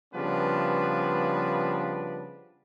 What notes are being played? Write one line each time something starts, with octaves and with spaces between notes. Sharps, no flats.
C#3 F3 G3 B3 D4 B4